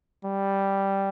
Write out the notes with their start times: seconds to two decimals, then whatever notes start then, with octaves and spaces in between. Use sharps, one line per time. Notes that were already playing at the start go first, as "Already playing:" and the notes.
0.24 G3